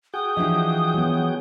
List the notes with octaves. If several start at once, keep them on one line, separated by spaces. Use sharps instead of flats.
F#4 G#4 G5 D#6
E3 F3 D4 G4 D#5
F#3 B3